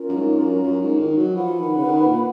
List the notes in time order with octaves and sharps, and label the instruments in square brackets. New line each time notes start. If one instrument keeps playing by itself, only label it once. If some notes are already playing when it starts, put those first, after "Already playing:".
Already playing: [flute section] C#4 F4 A#4
[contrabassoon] F#2
G#2
F#2
F#2
G#2
D#3
F#3
[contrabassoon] F3 [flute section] B4 F#5 B5
[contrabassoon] D#3
C#3
D#3
A#2